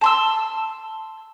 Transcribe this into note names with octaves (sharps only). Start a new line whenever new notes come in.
A5 C6 E6